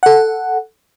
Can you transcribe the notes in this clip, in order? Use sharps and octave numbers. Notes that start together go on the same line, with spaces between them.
A4 F#5